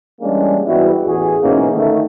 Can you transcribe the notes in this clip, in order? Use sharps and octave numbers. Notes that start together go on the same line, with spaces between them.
E3 G3 G#3 A#3 C#4 D4
G#2 E3 G3 B3 E4 F#4
A1 E2 F#4 G#4
G#2 B2 E3 A#3 C#4 D#4
D3 D#3 A3